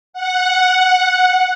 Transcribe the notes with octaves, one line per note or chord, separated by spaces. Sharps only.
F#5